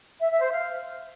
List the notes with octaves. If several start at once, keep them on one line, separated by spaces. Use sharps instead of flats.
E5
E5
C5
F5